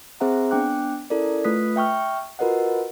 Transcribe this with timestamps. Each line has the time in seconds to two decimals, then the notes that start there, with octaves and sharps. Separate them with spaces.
0.20 C4 G#4 C5 E5 F#5 A#5
0.51 B3 D4 G5 D6 F#6
1.10 C#4 E4 A4 A#4 D5
1.45 A3 F4 B4 D#6 F#6 B6
1.76 E5 G5 C#6 F6
2.39 F4 F#4 A#4 B4 D#5 F#5